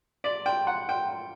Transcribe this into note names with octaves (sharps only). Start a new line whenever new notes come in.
D5
G5
F#5
G5